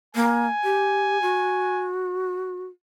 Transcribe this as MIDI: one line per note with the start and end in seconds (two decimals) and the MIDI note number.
0.15 0.47 58
0.15 1.89 80
0.64 1.21 67
1.22 2.66 66